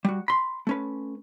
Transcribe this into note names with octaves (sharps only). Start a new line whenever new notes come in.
G3 F#4
B5 C6
A3 C#4 B4